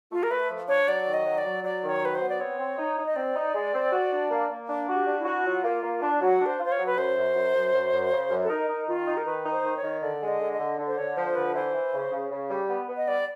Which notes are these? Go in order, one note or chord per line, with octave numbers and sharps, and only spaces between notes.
A3 F4
A#4
A3 B4
F3
D4 C#5
F#3 D5
D#3
D#5
F#3
D5
F#3
F#3 D5
D#3
C#5
F#3 B4
C5
B3
D5
C4 C#5
C4
D#4
D#4
D#5
C4 D5
D#4
G#3
C4
F#4
D4
A#3
A#3
D4
F#4
G4
D4
E4
F#4
F#3 F4
A#3
A#3
D4
F#3 F#4
D4
C5
F4
C5
C#5
F#3
B4
F#2 C5
F#2
F#2
F#2
F#2
F#2
C#3
F#2
A4
D#4 A#4
D#4
D#3 F4
D#4
A#4
D#3 B4
D#4
C5
D#3
C#5
D#3
D3 D5
G#3
D#5
D3
D#5
D3
D3
C5
D3 C#5
F3 C5
D3 B4
E3 C5
E3
C#3
C#3
C#3
G3
B3
B3
D#5
G3 D5